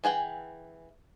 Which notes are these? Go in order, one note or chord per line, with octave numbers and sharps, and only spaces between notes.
E3 G#4 F#5 G5